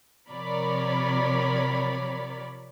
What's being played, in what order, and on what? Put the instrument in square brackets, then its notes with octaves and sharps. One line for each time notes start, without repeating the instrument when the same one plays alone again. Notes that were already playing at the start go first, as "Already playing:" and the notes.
[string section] C3 F3 A#4 C#5 D5 B5